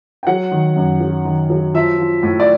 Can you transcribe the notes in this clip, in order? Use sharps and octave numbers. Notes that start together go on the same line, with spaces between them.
G5
F#3 F#5
D#3
F#2
F#3
D#3
F#3
F3 E5
F3
A2
D5